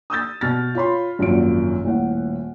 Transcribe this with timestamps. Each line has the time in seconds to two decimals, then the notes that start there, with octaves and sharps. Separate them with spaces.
0.10 D#6 E6 G6 A6
0.41 B2 F6 A6
0.75 F4 C#5 B5 C6
1.19 G#1 F#2 A#2 F3 F#4 D7
1.84 D#1 A2 F#5